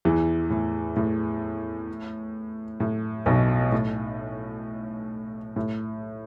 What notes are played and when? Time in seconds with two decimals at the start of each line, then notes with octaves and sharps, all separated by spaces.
0.05 E2 E3
0.50 A2
0.96 A2
2.80 A2
3.26 B1 B2
3.72 A2
5.56 A2